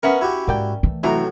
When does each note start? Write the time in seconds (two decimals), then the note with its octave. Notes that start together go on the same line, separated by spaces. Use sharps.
0.03 B3 C#4 A#4 E5 F#5
0.21 E4 F#4 G4
0.47 G#2 A#3 D5 G5
0.83 E3 A3
1.03 B1 A2 C3 E4 F#4 A#5